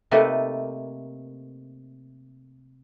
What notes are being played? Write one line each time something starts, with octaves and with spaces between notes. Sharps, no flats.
C3 A3 A#3 D#4 A4 B4